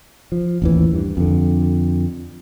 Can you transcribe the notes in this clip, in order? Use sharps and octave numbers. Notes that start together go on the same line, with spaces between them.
F3
A1 D#2 E3
G2
F2 D3